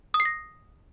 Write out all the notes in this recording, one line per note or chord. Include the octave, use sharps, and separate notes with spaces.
D#6
C7
A#6